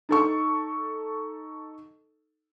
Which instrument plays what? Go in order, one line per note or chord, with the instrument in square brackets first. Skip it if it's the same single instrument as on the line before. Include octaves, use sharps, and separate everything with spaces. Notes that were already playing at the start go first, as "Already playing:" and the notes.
[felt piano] D#4 A4 C#6